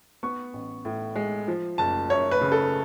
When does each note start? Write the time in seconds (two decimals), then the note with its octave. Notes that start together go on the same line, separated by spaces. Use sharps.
0.23 B3 C#6
0.53 A1
0.85 A2
1.16 G#3
1.48 F3
1.78 F#1 A5
2.10 F#2 C#5
2.31 B4
2.41 C#3
2.52 A4